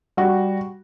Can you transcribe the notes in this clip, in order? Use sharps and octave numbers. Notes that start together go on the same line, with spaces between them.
G3 F#4